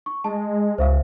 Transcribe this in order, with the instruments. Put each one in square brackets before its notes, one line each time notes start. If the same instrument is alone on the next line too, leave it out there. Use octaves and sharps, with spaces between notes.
[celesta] C#6
[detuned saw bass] G#3 [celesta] A5
[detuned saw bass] C#2 [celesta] C5 E5 F5